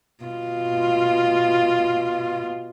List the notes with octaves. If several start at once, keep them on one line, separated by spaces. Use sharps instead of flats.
B2 F4